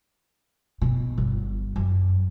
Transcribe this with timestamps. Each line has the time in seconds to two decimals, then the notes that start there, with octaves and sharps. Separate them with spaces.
0.82 B2
1.18 G1
1.76 F#2